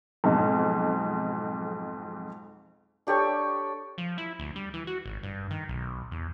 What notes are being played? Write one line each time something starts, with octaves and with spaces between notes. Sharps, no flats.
B1 F2 G#2
D4 G4 A4 C#5
F3
E4
D2
G3
E3
F#4
G#1
G2
D#3
B1
E2